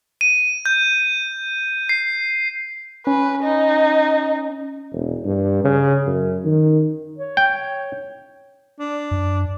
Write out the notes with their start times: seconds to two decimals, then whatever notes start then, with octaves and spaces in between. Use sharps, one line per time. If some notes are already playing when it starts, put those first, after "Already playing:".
0.21 D#7
0.66 G6
1.89 C7
3.07 C#4 B4
3.43 D#4
4.92 E1
5.25 G2
5.64 C#3
6.07 F#2
6.45 D#3
7.18 C#5
7.37 G5
8.79 D4
9.11 F#2